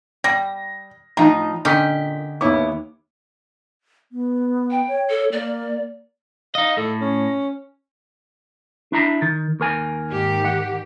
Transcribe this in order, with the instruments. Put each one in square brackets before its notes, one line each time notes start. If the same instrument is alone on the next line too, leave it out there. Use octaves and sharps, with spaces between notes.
[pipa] G3 [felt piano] A#6
[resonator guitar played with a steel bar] A2 F3 D#4 [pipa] G3 [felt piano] A#5
[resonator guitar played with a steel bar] A#2 [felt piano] D3 B6 [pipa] C#4 D#4 G4
[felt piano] D#2 C#5 D6 [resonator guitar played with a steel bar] B3 E4
[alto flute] B3
[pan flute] G5
[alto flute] C#5
[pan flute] A4
[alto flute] A#3 [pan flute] D5
[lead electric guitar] D#4 D#5 [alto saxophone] F5
[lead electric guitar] A2 [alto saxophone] A4
[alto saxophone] C#4
[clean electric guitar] D4 E4 A#5
D#3
D#2 A#4 G#5
[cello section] G#2 D#3 G4
[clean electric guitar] F#5